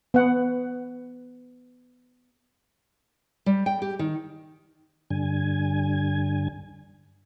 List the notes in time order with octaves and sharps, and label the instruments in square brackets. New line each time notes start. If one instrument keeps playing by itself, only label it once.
[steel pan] B3 F#5
[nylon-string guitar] G3
G5
G4
D#3
[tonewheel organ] G2 D3 G#5